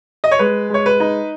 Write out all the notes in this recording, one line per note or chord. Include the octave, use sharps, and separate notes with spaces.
D#5
C#5
G#3 B4
G#3 C#5
B4
D#4